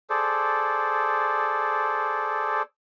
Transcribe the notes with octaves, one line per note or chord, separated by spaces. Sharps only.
G#4 A4 C5 D5